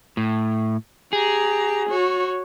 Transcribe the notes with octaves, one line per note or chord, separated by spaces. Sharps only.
A2
G4 G#4 A#5
F#4 C#5